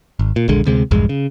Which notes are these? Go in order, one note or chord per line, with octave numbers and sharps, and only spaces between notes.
G#1
A#2
D#1 A#1 D3 G#3
D2 C3 G#3
A#1 E2 G2 G#3
C#3